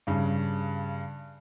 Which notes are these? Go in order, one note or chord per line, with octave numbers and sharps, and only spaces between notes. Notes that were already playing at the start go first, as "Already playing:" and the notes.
G2 C#3